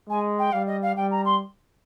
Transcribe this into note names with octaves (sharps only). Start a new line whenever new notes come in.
G#3 G#5
G5
G3 F5
D#5
F5
G3 G5
A#5
C6